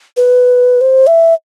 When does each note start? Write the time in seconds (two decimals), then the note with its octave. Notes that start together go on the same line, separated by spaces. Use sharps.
0.17 B4
0.81 C5
1.07 E5